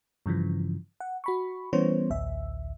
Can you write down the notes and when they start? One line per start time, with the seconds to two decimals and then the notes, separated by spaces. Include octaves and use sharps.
0.26 G2 C#3 E3 F3
1.00 F#5
1.24 F#4 B5 C#6
1.73 E3 G3 B3 C#4 C5 C#5
2.10 A1 D2 E5